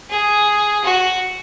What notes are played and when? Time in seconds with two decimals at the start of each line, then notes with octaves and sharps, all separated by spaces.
0.10 G#4
0.84 F#4